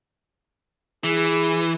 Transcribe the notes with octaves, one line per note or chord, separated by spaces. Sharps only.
E3 G#4